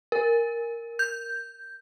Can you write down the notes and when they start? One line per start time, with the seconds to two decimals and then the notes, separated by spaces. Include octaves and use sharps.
0.12 A#4
0.99 G6